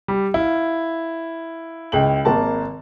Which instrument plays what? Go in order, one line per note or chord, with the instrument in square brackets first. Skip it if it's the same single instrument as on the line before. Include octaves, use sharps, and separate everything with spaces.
[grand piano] G3
E4 F5
[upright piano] C#2 G5 F#7
G#1 A#3 A5